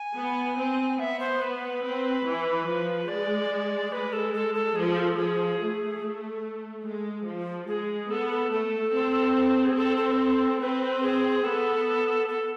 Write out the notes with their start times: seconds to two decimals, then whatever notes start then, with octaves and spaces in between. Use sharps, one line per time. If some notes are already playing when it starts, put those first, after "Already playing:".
Already playing: G#5
0.16 B3
0.57 C4
0.99 B3 E5
1.20 C5
1.42 B4
1.83 C4
2.25 E3
2.67 F3
3.08 G#3 D5
3.92 G#3 B4
4.13 A4
4.34 A4
4.55 A4
4.76 F3 G#4
4.97 A4
5.17 F3 G#4
5.59 A3
6.85 G#3
7.26 F3
7.67 G#3 G#4
8.10 B3 A4
8.31 A4
8.51 A3 A4
8.94 C4
9.65 G#4
9.77 C4 A4
9.97 A4
10.60 C4 B4
11.03 G#4
11.44 B3 A4
12.28 A4